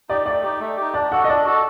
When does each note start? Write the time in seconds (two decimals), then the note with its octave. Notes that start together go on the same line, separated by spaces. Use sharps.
0.09 D#4 G4 D5
0.26 A3 D5
0.43 D#4 G4
0.60 A3
0.77 D#4 G4
0.94 D4 D5
1.12 F#4 A4 F#5
1.24 D#5
1.29 D4 D5
1.45 F#4 A4